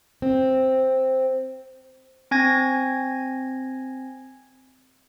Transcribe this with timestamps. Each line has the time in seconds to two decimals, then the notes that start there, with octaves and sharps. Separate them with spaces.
0.22 C4
2.31 C4 G#5 G#6 A#6